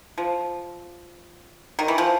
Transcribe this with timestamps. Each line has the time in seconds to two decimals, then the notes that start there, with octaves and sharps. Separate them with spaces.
0.18 F3
1.79 D#3
1.88 E3
1.98 F3